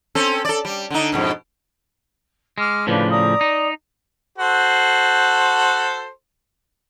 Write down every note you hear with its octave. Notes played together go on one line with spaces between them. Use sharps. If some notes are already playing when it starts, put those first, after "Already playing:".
C4 C#4 A4
A4 D5
G3
D3 D#4
F2 G#2 B2
G#3 D6 F6
A2 C#3 F3 D4 B4
D5 A#5 D#6
D#4
F#4 A4 C5